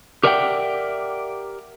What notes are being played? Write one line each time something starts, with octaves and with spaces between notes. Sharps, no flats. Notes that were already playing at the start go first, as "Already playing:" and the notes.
G4 A#4 D5 E5 F#5 G5